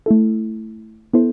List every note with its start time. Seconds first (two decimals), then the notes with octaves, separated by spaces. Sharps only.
0.06 A3 E4 A4
1.13 B3 E4 A4 C5